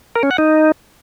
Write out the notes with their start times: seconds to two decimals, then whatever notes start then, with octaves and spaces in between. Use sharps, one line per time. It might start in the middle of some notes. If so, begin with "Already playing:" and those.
0.15 A#4
0.23 C#4
0.31 F#5
0.38 D#4